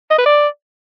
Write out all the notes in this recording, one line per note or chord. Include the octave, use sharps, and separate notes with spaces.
D#5
B4
D5